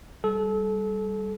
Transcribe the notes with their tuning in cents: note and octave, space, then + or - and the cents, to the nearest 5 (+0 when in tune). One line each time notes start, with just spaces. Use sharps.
G3 +0 A4 -30